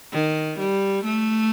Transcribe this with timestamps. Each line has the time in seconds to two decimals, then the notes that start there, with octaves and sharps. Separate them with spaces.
0.12 D#3
0.59 G3
1.05 A3